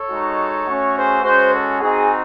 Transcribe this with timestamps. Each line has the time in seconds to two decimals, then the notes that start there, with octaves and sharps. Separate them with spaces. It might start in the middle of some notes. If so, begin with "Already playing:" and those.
Already playing: A4 C#5
0.10 G#3 D#4 F#4
0.67 A3 C#4 F#4
0.95 G#4 C5
1.23 G#3 C#4 F#4 G#4 C5
1.51 A4
1.80 C4 D#4 F#4 G#4